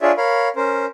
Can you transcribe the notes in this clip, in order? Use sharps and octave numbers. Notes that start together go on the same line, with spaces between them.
D4 F4 G#4 C#5 D5 E5
A#4 C#5 F5 B5
C#4 A#4 C5